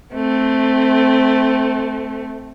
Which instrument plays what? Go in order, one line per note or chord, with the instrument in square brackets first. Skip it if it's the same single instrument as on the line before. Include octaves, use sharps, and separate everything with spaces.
[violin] A3 C4